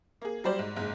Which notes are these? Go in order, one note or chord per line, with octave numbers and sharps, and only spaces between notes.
A#3 G#4
F#3 G3 C5 D5
G#2
F#1 G#2